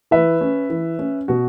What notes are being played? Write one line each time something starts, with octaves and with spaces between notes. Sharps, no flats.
E3 B4 E5
C#4
E3
C#4
B2 F#4